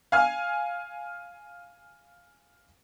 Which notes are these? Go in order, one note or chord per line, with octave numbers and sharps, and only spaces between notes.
F5 G#5 F6